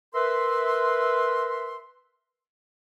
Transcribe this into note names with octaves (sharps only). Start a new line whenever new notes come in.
A#4 B4 E5 C6